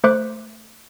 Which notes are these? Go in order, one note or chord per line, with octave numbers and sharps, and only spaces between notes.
A3 C5 E5 D6 F#6